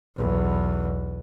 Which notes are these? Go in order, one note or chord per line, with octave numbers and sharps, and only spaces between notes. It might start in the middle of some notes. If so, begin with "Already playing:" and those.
B1 E2